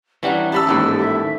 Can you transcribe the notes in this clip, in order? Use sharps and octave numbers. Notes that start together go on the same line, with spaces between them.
E3 G3 C#4 D4 F#5 A#5
D#4 G4 A5 B5 E6
A1 D#2 G#2 F#3 D4 A4
E5